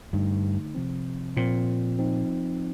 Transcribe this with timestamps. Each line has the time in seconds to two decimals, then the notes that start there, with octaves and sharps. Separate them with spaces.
0.13 G2 D3 A3 D#4
0.75 C3 F3 C4
1.37 A#2 F3 C4 F4
1.98 F3 C4 D#4